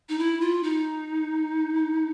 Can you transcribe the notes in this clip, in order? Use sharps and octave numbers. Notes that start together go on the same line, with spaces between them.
D#4
E4
F4
D#4